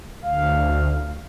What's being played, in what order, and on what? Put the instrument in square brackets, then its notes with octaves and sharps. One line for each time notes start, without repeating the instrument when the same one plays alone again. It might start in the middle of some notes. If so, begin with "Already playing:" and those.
[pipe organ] D2 [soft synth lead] F5